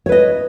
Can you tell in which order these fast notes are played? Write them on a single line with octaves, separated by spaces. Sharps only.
C#5 B4 D#5